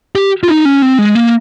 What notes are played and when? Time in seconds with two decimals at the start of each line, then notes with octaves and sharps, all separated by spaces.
0.15 G4
0.44 F4
0.48 D#4
0.65 C#4
0.82 C4
0.98 G#3
1.15 A#3